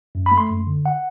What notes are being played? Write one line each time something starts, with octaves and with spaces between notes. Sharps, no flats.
F#2
B5
A3
C6
F#2
D3
F#5